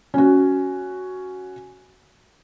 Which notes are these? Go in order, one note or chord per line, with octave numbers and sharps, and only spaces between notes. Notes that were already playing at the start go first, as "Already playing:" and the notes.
C#4 F#4